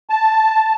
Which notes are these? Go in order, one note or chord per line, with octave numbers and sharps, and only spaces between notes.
A5